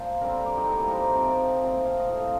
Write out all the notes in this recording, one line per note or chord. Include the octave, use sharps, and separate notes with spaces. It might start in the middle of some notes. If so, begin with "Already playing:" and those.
Already playing: A#2 F3 C5
D3 G3 C4 A#4
G4
D#4
A2 G3 A#3 A4
A#4
C5
G5
C3 F3 C4 A5
A#2 A3 C4
F5
D#5
A2 F3 C4 F5